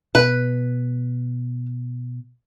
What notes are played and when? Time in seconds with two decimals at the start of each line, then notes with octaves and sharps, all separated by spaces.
0.15 B2 B4